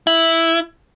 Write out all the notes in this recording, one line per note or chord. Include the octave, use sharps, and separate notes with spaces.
E4